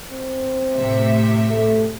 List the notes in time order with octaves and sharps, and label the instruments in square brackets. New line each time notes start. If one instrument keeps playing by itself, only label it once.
[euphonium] C4
[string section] A2 C3 E5
[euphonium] A3